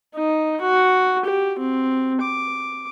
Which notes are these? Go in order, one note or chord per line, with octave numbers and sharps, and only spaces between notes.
D#4
F#4
G4
C4
D6